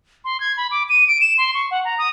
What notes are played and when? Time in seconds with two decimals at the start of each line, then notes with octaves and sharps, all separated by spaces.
0.25 C6
0.40 G#6
0.57 B5
0.71 D6
0.89 D#7
1.08 D7
1.21 E7
1.38 C6
1.54 C#6
1.71 F#5
1.85 A#5
1.98 D#6